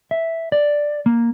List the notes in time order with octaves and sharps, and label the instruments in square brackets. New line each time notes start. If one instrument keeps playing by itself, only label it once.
[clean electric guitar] E5
D5
A#3